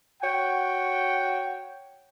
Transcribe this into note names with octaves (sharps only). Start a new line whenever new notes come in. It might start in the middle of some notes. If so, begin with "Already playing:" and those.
F#4 C#5 F#5 G5